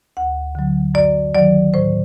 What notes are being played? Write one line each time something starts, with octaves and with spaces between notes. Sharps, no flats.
D2 F#5
D3 F#3
F#2 D5
D#3 F#3 D5
A2 C5